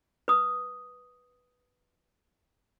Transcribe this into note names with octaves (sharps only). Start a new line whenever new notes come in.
B4 D#6